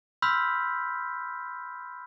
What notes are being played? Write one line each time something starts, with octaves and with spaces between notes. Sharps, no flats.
B5 C6 E6 F6 G6 B6